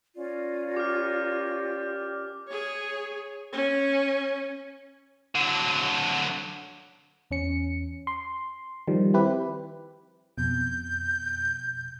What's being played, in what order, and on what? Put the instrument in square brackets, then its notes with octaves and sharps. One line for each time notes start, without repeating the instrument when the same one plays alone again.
[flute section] C#4 A#4 D5 [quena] F4
[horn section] G4 [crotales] D6 F6
[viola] G#4 C#5
C#4
[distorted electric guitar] D3 F#3
[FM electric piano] E2 C#4 C#7
C6
D#3 F3 G3
C4 E4 G4 B4
[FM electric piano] F2 B2 [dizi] G6